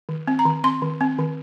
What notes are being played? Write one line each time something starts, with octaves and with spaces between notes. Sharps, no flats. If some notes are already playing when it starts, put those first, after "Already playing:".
D#3
C4
A#5
D#3
C4 C6
D#3
C4
D#3